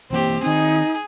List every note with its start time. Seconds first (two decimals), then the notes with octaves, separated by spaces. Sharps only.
0.10 B1 E3 A#3 C4 G4
0.43 D#3 C4 D#4 G#4